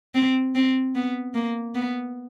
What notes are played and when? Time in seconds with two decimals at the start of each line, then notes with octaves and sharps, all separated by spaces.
0.15 C4
0.55 C4
0.95 B3
1.34 A#3
1.75 B3